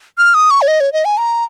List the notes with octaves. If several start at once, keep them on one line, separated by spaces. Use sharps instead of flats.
F6
D#6
C#6
C#5
D#5
C#5
D#5
G#5
A#5